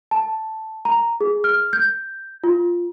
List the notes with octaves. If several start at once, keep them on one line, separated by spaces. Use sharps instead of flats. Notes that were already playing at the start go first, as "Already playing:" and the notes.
A5
A#5
G#4
F6
G6
F4